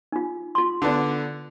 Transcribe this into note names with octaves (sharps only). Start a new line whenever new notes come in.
D#4 F4
F4 C6
D3 B3 D4